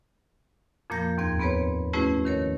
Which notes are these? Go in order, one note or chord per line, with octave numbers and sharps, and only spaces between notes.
F2 A#2 F3 A#3 G6 A#6
D#2 G#2 C4 G#6
B3 C4 G#4 B4 C#5
A3 C#4 E4 F#4 G#4 B4
D#3 A#4 C#5